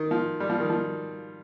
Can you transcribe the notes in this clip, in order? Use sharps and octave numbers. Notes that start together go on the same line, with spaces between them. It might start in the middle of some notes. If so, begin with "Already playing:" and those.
Already playing: D#3
F3
G3
F3
D#3
F3